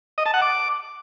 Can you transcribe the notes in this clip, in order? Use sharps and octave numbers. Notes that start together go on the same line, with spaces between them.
D#5
A5
F#5
D6